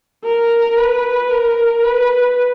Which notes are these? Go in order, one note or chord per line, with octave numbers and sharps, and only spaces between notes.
A#4
B4
A#4
B4